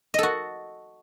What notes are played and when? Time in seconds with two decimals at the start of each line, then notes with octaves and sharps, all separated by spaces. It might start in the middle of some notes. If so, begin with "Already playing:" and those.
0.14 D#5
0.19 A4
0.23 F#4